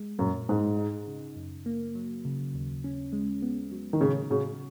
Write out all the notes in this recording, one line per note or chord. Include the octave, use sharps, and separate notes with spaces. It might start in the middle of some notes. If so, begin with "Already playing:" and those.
Already playing: G#3
F#2 A#2
G#2 G#4
D#4
C#3
F#2
A#3
F#3
C#3
D#2
C#4
G#3
B3
F#3
D#3
C#3 C#5
C#3 F#4